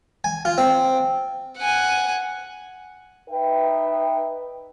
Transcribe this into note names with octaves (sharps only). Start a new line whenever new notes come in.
G#5
F4
C4
F#5 G#5
D#4 B4 E5 G5